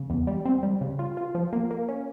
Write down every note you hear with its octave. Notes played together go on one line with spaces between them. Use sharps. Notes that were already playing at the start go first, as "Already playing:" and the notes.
Already playing: C#3
E2
G3
C4
G3
C#3
F4
F4
F3
A#3
A#3
C#4